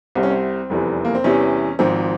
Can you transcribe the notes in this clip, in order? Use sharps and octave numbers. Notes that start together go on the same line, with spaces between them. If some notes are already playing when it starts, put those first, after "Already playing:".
C2 C3 G3 C4
C#4
C4
F1 E2 E3 G3
A#3
C4
E2 C3 E3 G3 C#4
G#1 G#2 F3 C4